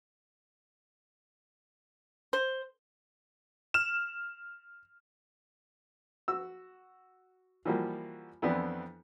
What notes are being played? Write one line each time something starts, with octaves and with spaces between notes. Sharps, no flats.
C5
F6 E7
F#4 E6
E3 F3 G3 A#3 F#4
F2 E3 B3 C4 D4 E4